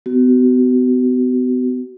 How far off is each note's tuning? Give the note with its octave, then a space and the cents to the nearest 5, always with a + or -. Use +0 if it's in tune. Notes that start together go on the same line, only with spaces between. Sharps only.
B3 +35 F#4 +35